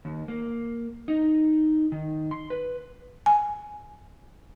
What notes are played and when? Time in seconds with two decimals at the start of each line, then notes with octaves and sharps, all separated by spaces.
0.05 D#2
0.28 A#3
1.08 D#4
1.92 D#3
2.31 C6
2.50 B4
3.26 G#5